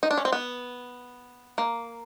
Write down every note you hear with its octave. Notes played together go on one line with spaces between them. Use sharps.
D#4
D4
C#4
C4
B3
A#3